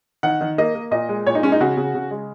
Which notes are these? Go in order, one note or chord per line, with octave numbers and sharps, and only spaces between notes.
D#3 F#5
D#3
A#3 D#5
A#3
A#2 D#5
G#3
A#2 C#5
D#4
G#3 C#4
D#4
C#3 F#4
C#3
C#3
G#3